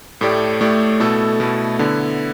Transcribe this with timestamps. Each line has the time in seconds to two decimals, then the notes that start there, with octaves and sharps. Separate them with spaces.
0.21 A2 A3 G4 D5
0.61 A2 A3 G4 D5
1.00 B2 A3 E4 A4
1.40 B2 A3 E4 A4
1.79 D3 B3 E4